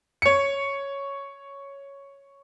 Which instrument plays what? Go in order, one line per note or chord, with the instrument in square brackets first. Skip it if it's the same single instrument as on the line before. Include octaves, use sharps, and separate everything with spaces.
[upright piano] C#5 C#7